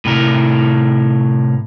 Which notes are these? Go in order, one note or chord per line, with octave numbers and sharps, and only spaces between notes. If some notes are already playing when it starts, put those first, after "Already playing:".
A2 C3 A#4